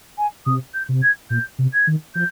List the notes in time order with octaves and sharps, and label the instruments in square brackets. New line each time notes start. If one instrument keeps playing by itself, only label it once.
[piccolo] G#5
[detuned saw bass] C3 [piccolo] D#6
[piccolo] G6
[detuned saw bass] C3
[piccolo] G#6
[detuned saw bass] A#2 [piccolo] G6
[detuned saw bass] C3
[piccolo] G#6
[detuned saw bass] D#3
[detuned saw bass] F3 [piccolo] G6